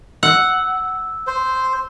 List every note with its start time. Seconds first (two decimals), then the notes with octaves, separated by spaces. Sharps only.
0.23 F#5 E6
1.27 C5